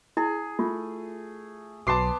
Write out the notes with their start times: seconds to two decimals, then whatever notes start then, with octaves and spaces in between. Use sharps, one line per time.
0.17 E4 G#4
0.59 A3 F4
1.87 B1 F#3 B3 A5 C6 D6 C7